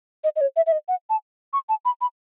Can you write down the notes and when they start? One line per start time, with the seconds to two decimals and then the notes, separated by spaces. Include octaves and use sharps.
0.24 D#5
0.36 D#5
0.41 C#5
0.56 E5
0.67 E5
0.72 D#5
0.88 F#5
1.10 A5
1.53 C#6
1.69 A5
1.85 B5
2.01 B5